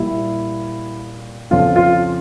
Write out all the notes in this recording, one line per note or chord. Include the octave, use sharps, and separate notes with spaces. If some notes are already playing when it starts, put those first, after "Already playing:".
Already playing: A#2 G3 E4
F2 C#3 F3 F4
F4